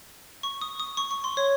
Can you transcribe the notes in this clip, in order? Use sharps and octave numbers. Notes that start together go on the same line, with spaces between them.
C#6
D#6
D#6
C#6
C#6
C6
C#5